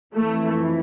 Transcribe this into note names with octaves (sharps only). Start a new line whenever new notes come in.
F2 E3 A3